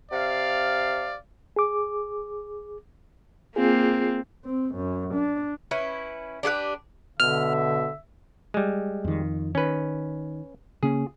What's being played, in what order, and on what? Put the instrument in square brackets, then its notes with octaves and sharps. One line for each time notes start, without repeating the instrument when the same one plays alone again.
[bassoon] C3 [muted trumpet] D5 [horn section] F5
[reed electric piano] G#4 D6
[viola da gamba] A#3 C4 [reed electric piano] F4 G#4
[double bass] C4
F#2
D4
[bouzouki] C#4 E4 B4
D4 G4 G#4 B4
[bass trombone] B2 [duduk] D3 [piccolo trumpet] E5 [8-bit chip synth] F6
[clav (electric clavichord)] G3 G#3
[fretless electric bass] F2 D#3
[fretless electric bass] D#3 [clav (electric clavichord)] C#4 B4
[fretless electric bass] C#3 A#3 C#4 [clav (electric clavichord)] G#4